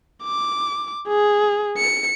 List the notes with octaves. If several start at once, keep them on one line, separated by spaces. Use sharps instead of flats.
D6
G#4
C#7